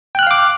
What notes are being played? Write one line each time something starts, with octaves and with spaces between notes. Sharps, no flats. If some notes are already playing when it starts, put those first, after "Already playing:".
F5 G5 D6 F6 F#6